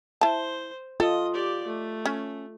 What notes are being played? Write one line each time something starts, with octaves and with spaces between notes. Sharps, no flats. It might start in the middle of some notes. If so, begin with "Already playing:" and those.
E4 C5 A5
F4 A4 D#5
G4 D5
A3
C#4